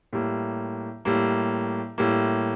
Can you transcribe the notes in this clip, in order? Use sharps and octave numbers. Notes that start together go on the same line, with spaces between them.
A2 G3 A#3
A2 G3 A#3
A2 G3 A#3